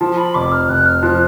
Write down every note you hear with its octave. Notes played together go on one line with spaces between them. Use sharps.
F3 A5
B5
F1 D6
F6
F1 F#6
F6
F3 F#6